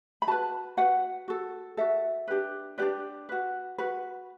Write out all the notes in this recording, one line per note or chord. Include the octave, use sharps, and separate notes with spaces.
B5
F#4 B4 A5
F#4 B4 F#5
F#4 A4
F#4 A4 E5
D4 G4 B4
D4 G4 B4 D5
F#4 B4
F#4 B4